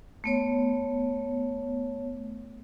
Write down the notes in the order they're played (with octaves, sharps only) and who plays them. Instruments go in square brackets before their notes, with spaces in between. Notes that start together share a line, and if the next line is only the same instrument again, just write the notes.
[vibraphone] A3 B3 C#5